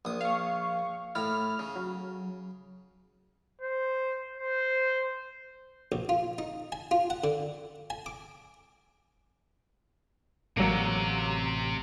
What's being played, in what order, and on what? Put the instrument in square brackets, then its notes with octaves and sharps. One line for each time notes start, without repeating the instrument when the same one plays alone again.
[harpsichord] A#1 D#6
[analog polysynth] F5 C#6
[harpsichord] A2 E4 [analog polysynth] F6
[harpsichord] C#3
[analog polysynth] F#3
[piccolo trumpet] C5
C5
[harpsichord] A#1
F4
D#4
G#5
F4
F#5
D3
G#5
D6
[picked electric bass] A1 [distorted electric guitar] C3 [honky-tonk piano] F#3 A#3